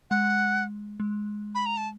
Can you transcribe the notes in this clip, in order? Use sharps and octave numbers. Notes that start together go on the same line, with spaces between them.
G#3 F#5
G#3
B5
A#5
A5